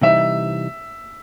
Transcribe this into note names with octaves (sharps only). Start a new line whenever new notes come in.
C3 E3 G3 C4 D#4 E5